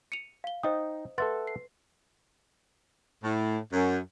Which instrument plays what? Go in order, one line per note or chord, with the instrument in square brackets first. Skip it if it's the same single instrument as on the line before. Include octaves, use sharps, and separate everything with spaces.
[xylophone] C#7 D#7 F7
F5 G7
[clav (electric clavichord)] D#4 G5 [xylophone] C5 D#5 D#6
[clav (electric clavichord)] A4 E5 F#5 [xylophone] B4 C6 A6
[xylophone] C7
[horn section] A2
F#2